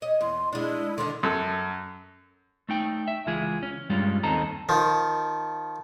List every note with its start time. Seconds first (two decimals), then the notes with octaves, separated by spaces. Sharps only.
0.02 C#5 D#5
0.21 E2 C6
0.52 G#3 D4 E4
0.98 D3 D#3 D4 C6
1.23 F#2 A4
2.69 A3 D#4 G5
3.08 E5
3.27 C#2 E3 G#3 F4 G#4
3.63 C#4
3.90 G2 G3 G#3 C#4 F4
4.23 D#2 C4 D#4 A4 A#5
4.69 D#3 F3